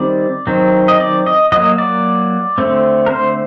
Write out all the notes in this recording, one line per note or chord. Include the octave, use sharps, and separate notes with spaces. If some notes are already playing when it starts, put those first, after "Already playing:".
Already playing: D#3 G3 C4 D5
D#3 F#3 C4
D#5
D5
D#5
F#3 A#3 D#5
D5
D3 A3 C4
A#4
C5